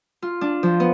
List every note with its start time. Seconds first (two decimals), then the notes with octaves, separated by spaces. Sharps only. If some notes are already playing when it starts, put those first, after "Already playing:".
0.22 F4
0.41 D4
0.63 F3
0.80 B3